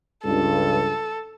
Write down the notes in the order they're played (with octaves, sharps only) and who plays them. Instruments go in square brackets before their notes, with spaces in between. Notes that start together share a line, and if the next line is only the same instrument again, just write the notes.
[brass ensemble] C#2 G2 [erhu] A4